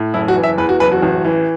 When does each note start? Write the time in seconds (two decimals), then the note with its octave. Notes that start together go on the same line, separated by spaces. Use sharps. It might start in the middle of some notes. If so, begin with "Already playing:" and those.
Already playing: A2
0.14 F#1 E4
0.28 F#4
0.36 E3
0.43 E5
0.58 E2 B4
0.69 F#4
0.80 F#1 B4
0.92 F#4
1.02 A1
1.25 E3